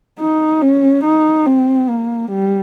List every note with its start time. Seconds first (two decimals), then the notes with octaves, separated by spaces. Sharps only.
0.19 D#4
0.61 C#4
1.04 D#4
1.46 C4
1.89 A#3
2.31 G3